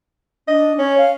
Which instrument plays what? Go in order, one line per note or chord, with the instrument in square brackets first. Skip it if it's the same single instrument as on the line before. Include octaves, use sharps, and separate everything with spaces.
[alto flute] D4 [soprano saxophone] D#5
[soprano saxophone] C#4 [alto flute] C#5
[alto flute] F5